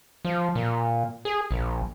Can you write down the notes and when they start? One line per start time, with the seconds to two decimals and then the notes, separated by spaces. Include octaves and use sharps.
0.25 F3
0.55 A#2
1.25 G#4
1.51 A#1